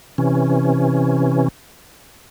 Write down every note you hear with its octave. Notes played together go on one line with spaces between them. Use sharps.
C3 E3 C#4